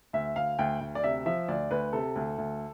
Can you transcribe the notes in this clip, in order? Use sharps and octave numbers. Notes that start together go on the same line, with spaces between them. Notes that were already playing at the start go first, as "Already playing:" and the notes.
D2 E5
D2 F5
D2 G5
D2
D5
C3 E5
F3 E5
D2 D5
D2 B4
C3 A4
D2
D2